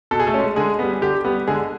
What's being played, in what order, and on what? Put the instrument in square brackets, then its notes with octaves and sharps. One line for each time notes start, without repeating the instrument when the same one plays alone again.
[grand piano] B2 A4
G#4
A3 A4
G#3 C#4
D3 G#3 G#4
G3 B3
D3 G4
G3 B3
D3 G#3 G#4